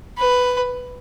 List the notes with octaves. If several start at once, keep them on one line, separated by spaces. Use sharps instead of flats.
B4